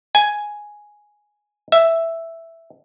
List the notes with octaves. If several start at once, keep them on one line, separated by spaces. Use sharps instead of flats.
G#5
E5